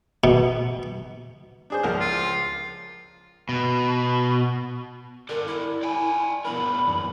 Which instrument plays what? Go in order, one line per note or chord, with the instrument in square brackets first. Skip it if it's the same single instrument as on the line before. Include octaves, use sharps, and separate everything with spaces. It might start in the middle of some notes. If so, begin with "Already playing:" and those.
[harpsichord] B2
[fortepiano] D4 G#4 C5
C#2 F3 A#4
[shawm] F4
[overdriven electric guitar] B2
[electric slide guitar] G4 A4 D5 [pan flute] A#4
[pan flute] E4
[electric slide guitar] D5 G5 G#5
[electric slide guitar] B3 D4 A#4 [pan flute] B5
[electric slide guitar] F#2 E3